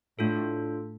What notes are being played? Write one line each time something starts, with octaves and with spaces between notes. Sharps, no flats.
A2 D4 F4 A4